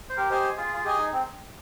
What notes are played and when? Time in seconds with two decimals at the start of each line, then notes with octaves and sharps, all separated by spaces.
0.10 C5
0.17 G4 A#4
0.30 G4 C5 D#5 G#5
0.57 F4 G#4
0.74 F4
0.84 G4 G#4 D#5 G#5
0.98 D#4
1.13 C4